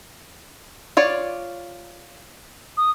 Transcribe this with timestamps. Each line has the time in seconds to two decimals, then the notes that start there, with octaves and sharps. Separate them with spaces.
0.97 F4 C#5 D5
2.77 D#6